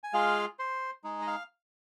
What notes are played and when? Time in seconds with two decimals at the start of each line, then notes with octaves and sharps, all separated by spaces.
0.04 G#5
0.13 G#3 F4 G#4 F5
0.59 C5
1.04 G#3 D#4 G#4
1.22 D#5
1.27 F5